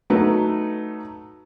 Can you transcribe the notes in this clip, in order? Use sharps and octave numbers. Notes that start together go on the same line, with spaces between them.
F#3 A3 D#4 B4